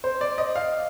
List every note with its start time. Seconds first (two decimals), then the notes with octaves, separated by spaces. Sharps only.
0.04 C5
0.21 D5
0.38 D#5
0.56 F5